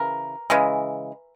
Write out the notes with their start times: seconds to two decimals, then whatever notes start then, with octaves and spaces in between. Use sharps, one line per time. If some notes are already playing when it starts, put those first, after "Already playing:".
Already playing: C#3 E3 A#4
0.50 C#3 E3 G#3